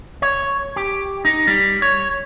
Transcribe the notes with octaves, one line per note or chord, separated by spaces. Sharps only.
C#5
G4
D#4
G3
C#5